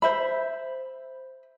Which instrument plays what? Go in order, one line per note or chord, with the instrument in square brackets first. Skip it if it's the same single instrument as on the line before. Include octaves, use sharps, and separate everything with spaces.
[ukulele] C5 E5 B5